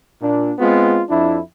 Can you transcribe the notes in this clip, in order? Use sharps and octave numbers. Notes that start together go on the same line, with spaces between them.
A#2 D4
G#3 B3 C4 F4
F2 D4 E4